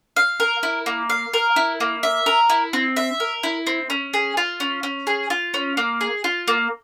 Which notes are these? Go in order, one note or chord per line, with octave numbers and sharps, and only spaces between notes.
F5
A#4
E4
A#3
F5
A#4
E4
A#3
E5
A#4
E4
C4
E5
A#4
E4
C4
C#4
G#4
F4
C#4
C#4
G#4
F4
C#4
A#3
G#4
F4
A#3